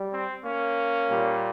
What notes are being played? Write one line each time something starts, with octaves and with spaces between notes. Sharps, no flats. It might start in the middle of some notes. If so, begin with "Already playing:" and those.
Already playing: G3
C4
A#3 C#4
A#2 G3